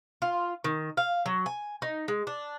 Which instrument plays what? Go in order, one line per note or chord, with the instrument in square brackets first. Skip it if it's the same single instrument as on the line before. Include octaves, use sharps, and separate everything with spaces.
[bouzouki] F4
D#3
F5
F#3
G#5
D#4
G#3
D4